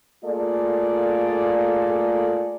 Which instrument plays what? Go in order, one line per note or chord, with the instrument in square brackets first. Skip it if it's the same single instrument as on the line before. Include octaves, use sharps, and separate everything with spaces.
[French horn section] A3 A#3 F4 G#4 A4 D5